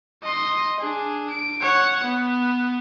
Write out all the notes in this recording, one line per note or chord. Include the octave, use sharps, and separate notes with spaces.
D#5 C6
D4 G#4
D7
C#5 F#5
B3